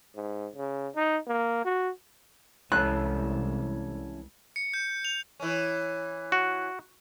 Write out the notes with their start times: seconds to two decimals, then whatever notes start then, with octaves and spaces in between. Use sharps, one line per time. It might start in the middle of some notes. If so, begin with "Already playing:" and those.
0.16 G#2
0.56 C#3
0.95 D#4
1.27 A#3
1.65 F#4
2.72 C2 E3 G#3 C#4 A4 F#6
4.56 C#7
4.74 G6
5.05 F7
5.40 E3 C#4
6.32 F#4